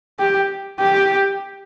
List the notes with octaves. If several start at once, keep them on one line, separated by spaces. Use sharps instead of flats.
G4
G4